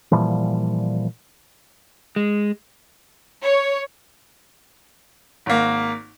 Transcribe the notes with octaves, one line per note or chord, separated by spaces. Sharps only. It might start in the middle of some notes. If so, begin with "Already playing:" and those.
A#2 E3 F3 G3
G#3
C#5
G#1 A#3